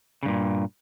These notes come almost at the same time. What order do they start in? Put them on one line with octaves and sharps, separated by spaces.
C#3 G2 A#2